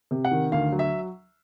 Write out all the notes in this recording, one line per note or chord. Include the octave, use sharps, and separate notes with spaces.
C3
F#5
D#3
D2 F5
F#3
E5